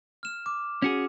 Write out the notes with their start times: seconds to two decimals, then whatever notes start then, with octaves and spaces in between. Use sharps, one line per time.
0.23 F6 E7
0.46 D6
0.82 C#4 F#4 G#4